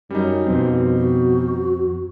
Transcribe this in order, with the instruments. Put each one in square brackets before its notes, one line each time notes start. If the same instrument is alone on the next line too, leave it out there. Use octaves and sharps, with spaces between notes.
[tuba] F#2 [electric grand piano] G3 C#4 D#4
[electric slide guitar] F2 C4 [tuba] B2
[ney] F#4